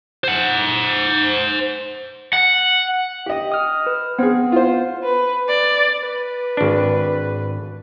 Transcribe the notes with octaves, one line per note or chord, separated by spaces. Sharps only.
C5 F#5
F#5
G4 D#5
D#6 F6
B4
B3 C4 G#4
F4 C5
B4
D5
B4
G#1 D4